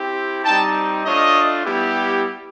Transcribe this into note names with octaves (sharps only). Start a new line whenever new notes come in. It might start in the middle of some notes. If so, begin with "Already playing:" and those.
Already playing: C4 E4 G4
G3 C4 D#4 G5 A5
A3 D4 F4 C#5 D#5
G3 B3 E4 G4